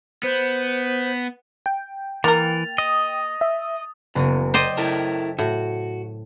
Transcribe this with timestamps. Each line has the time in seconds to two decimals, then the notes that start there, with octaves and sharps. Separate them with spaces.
0.23 B3 C5
1.66 G5
2.24 E3 A#3 A#4 A6 F7
2.78 D#5 D#6
3.41 E5
4.15 F#1 E2 B2
4.54 C5 D5 D#5 G5 G6
4.77 E4 A4 A#4
5.39 A2 F#4